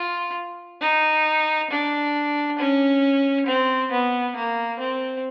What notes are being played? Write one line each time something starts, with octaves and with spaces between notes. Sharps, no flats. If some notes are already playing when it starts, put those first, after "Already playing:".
Already playing: F4
D#4
D4
C#4
C4
B3
A#3
C4